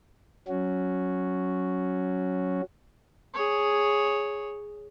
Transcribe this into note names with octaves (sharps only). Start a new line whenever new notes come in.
F#3 C#4 F#4
G#4 C#5